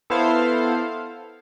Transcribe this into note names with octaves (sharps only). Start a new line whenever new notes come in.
B3 E4 A4 C5 F5